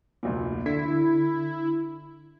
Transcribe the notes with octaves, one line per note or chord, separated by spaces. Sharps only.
F1 D2 A#2
D3 E4 B6